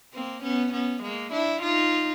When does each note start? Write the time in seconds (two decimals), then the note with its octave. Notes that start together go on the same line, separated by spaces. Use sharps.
0.13 A#3 C4
0.43 B3 C#4
0.73 B3 C#4
1.02 G#3 A#3
1.33 D4 E4
1.62 D#4 F4